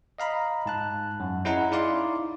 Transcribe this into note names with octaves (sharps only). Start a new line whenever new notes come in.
D#5 F5 A#5 B5
G#2 A5 F#6
F#2
C#4 E4 G#4 D#5 F#5 A#5
D#4 E4 D5 F5 C6 D6